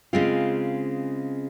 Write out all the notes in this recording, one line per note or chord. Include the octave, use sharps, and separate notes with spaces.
C#3 G#3 C4 F4